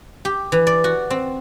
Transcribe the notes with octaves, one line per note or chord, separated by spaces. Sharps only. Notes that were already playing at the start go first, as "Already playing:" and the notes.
G4
E3
D5
F#4
C4